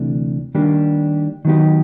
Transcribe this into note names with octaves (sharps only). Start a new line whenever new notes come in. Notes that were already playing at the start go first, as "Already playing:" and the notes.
Already playing: D2 C3 E3 A3 D4
D#3 G3 A#3 D4 G4
D#3 F#3 B3 D#4 G4